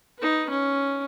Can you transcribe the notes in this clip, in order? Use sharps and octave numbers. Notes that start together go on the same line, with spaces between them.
D#4 B4
C#4